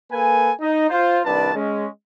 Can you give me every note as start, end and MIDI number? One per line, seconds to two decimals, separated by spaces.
0.12 0.51 58
0.12 0.51 69
0.12 0.51 71
0.12 0.51 80
0.60 0.87 63
0.60 0.87 75
0.89 1.21 65
0.89 1.21 72
1.25 1.55 36
1.25 1.55 51
1.25 1.55 62
1.25 1.55 71
1.25 1.55 74
1.25 1.55 81
1.55 1.88 56
1.55 1.88 61